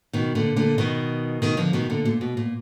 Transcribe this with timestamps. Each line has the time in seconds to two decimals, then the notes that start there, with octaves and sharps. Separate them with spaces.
0.13 B2 D#3
0.35 A#2 D3
0.56 A#2 D3
0.78 B2 D#3
1.42 B2 D#3
1.57 D3 F3
1.73 B2 D#3
1.90 A#2 D3
2.05 A#2
2.21 B2
2.37 A#2